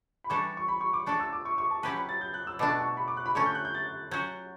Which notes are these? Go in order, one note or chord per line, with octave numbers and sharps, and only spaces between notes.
B5
E3 G3 D4 A4 C#6
C#6
B5
C#6
D6
A3 D4 A4 C#6
E6
D6
C#6
C#6
A5
F#3 C#4 G4 B4 A5
B5
A6
G6
F#6
E6
B2 A3 D4 D6
C#6
B5
D6
F#6
B5
D3 A3 C#4 C#6
G6
F#6
G6
A6
F#3 C#4 F#4 G6